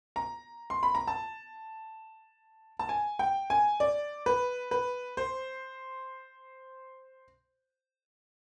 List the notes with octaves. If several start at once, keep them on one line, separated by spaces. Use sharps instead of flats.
A#5
C6
B5
A#5
A5
A5
G#5
G5
G#5
D5
B4
B4
C5